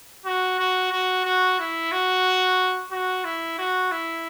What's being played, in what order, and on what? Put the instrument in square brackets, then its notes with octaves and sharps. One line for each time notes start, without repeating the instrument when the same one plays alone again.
[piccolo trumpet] F#4
F#4
F#4
F#4
E4
F#4
F#4
E4
F#4
E4